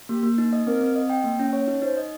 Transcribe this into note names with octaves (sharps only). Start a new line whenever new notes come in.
A#3 G4
A#3
D#4
D#5
C4 A#4
C4
D#5
G5
A#3
C#4
C#5
D#4
D#4 C5
D#5